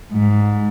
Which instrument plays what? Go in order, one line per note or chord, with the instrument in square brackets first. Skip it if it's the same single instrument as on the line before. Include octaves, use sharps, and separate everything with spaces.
[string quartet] G#2